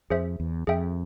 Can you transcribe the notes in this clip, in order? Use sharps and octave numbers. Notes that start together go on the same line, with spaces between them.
F2 G#4 C5 E5
E2
F2 G#4 E5 G5